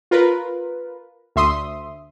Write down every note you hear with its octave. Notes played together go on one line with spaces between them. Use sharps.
F4 A#4 B4
D2 E5 C6 D#6